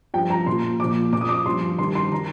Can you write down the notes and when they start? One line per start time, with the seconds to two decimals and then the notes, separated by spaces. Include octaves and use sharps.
0.14 G2 F3 G5
0.30 A#5
0.46 A#2 F3 C6
0.80 A#2 F3 D6
1.13 A#2 F3 D6
1.21 D#6
1.29 D6
1.46 G2 F3 C6
1.78 G2 D#3 C6
1.95 C6
2.12 D#3 A#5